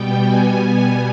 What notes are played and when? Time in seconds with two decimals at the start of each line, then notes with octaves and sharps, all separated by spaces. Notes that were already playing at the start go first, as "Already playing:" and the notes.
Already playing: B2 G3 B3 G5
0.27 G#5
0.71 G#5